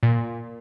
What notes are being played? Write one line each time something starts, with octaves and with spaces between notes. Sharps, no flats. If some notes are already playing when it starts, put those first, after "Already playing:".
A#2